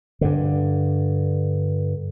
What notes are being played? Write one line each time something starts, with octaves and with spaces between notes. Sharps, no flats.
G2 D3